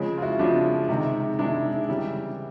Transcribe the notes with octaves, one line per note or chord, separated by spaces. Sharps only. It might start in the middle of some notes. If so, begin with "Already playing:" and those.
Already playing: C#3 F3 G#3
F4
E4 F#4
C#3 F3 G#3 D4 E4
C3 D#3 G#3
C3 D#3 G#3 D4 E4
C#3 E3 G3